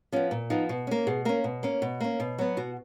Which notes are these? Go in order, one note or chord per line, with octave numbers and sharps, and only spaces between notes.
F3 B3 C#4
A#2
F3 B3 D#4
B2
A#3 C#4
B2 G#4
A#3 C#4 A#4
B2
A#3 C#4
B2
A#3 C#4
B2
F#3 B3
B2 F#4